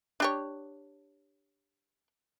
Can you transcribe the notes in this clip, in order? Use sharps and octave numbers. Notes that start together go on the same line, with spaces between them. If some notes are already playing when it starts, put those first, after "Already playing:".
D4 G4 C#5